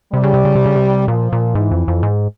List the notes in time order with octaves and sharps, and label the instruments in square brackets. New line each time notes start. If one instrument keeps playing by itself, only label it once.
[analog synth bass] C3 [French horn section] G3
[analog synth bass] C#3
C3
C#3
C3
C#3
C3
[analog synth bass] A#2 [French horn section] F3
[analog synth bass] A#2
[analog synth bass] G#2 [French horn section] E3
[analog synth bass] F2
F2
G#2